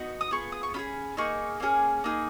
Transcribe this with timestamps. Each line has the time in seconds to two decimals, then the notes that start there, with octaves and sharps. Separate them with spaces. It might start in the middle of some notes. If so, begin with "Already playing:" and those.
Already playing: B3 D#4 F#4
0.21 D#6
0.31 B3 F4 G#4 C#6
0.52 D#6
0.63 C#6
0.74 C#4 F4 G#4 B5
1.17 A#3 D#4 G#4 C#6
1.60 A#3 C#4 G#4
2.04 A#3 D#4 G#4